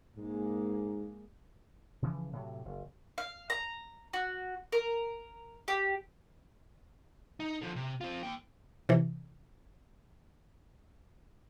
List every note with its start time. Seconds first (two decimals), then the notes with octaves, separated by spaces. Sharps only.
0.17 G#2 G#3 A#3
2.02 C#3 E3 F3
2.33 A2 C3 F#3
2.65 F#1
3.18 F5
3.50 A#5
4.13 F#4
4.72 A#4
5.68 G4
7.40 D#4
7.62 D3 F3
7.76 C3
8.01 C4 F4
8.23 A#3 G5
8.89 C3 E3